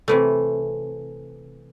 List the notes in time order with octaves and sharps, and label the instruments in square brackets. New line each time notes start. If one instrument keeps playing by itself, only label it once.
[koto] C3 E3 A3